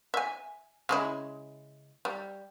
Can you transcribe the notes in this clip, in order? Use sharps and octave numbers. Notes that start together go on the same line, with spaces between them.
E5 G#5
C#3 G#3 E4
G3